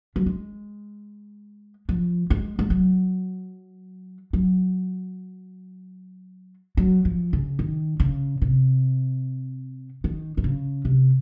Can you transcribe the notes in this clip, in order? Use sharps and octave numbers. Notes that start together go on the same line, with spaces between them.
F#3
G#3
F3
G#3
G#3
F#3
F#3
F#3
F3
C#3
D#3
C#3
C3
D#3
D#3
C#3
C3